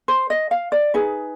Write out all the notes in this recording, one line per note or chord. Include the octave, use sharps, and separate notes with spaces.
C5
D#5
F5
D5
D#4 G#4 B4